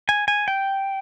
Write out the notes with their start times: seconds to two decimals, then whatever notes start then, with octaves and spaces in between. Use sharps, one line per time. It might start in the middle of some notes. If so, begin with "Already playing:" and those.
0.09 G#5
0.28 G#5
0.48 G5